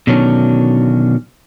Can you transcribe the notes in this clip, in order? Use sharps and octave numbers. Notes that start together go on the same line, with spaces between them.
B2 D3 D#3 F#3 C#4 D4